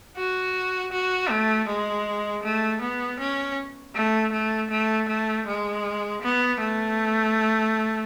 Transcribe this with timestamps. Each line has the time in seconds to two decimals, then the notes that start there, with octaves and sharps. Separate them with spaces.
0.17 F#4
0.92 F#4
1.30 A3
1.68 G#3
2.43 A3
2.81 B3
3.20 C#4
3.95 A3
4.32 A3
4.71 A3
5.09 A3
5.47 G#3
6.22 B3
6.60 A3